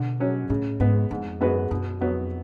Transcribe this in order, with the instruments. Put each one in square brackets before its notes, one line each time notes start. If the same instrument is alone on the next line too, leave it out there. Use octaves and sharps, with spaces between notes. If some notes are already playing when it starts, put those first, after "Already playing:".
Already playing: [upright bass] B2 [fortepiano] D3
[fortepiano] F#3 C#4
[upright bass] A2 [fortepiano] C#3
[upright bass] G#2 [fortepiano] G#3 B3
[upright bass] F2 [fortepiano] G#2
[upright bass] F#2 [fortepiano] G#3 B3 F#4 B4
[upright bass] F#2 [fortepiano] B2
[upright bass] F2 [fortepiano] F#3 B3 F#4